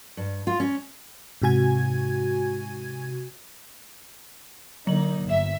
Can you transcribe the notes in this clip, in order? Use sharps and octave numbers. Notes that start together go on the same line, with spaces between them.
G2
F4
C#4
G#2 C3 F#4 G#5 G#6
D3 F#3 A#3 D#4 F#7
G1 E5